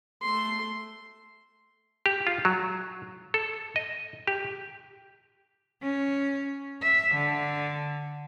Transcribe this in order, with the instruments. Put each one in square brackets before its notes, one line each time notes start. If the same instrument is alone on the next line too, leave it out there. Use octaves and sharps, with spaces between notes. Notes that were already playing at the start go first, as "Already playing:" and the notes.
[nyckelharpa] A3 C6
[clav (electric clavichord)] G4
F4
F#3
A4
D#5
G4
[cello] C#4
E5
D3